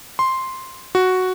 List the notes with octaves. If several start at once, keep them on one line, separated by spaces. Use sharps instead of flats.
C6
F#4